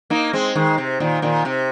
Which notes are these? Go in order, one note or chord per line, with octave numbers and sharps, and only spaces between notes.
A#3 D#4
G#3 C4
D#3 G#3
C3
A#2 D#3
A#2 D#3
C3